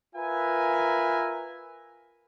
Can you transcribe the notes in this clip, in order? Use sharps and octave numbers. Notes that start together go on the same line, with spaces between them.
F4 A#4 B4 E5 G#5